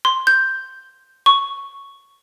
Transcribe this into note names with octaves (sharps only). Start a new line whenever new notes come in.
C6
G6
C#6